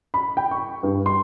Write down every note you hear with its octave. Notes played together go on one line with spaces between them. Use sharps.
B5
G5
C#6
G2
C6